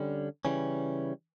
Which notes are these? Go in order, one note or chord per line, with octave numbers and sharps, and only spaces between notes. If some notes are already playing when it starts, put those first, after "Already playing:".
Already playing: D3 G3 C#4
C#3 E3 G3 C#4